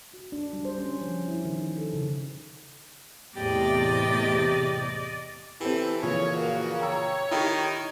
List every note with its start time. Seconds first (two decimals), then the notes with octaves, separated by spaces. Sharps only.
0.14 F#4
0.32 D4
0.53 G3
0.65 C5
0.78 C#4
1.01 F3
1.28 E4
1.45 D#3
1.78 A4
1.94 C#3
3.36 E2 A2 C3 G4 D5 D#5
5.61 E3 C4 G4 A4
6.03 A#2 C#3 E3 F3 C#5
6.36 A#3 F#4
6.81 C#5 G5 A#5 E6
7.31 D#3 E4 G4